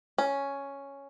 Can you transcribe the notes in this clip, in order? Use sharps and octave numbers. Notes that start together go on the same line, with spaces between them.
C#4